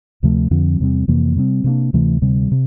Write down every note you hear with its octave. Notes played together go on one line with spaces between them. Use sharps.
D2 C3 F3 A3
F2 D3 F3 C4
E2 C3 G3 C4
F2 C3 E3 A#3
C3 G3 C4
C3 G3 A#3 D4
D2 C3 E3 A3
D2 C3 G3
C3